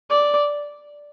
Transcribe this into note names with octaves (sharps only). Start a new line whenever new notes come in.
D5